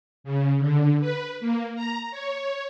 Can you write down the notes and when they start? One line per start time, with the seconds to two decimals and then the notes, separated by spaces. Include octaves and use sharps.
0.24 C#3
0.59 D3
1.00 B4
1.40 A#3
1.75 A#5
2.11 C#5